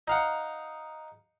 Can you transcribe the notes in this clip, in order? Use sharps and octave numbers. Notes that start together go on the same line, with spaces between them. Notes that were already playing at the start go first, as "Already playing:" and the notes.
D#4 F5 F#5